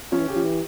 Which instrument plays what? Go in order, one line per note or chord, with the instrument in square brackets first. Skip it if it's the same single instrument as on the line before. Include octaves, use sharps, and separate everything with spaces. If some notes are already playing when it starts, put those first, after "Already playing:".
[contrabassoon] F3 [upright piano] C#4
[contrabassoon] E3
[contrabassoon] C#3 [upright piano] G4
[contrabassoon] F3
E3